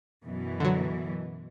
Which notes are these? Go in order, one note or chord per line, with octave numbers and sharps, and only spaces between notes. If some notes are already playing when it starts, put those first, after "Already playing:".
F#2 B2 E3
D3 F#3